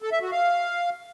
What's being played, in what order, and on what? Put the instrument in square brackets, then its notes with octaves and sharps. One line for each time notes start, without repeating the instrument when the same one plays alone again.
[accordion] A4
E5
F#4
F5